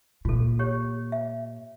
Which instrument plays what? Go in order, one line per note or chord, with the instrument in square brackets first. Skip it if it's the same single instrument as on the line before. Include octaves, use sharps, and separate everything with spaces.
[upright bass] A#2 [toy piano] F4 A4
[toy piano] G4 C#5
E5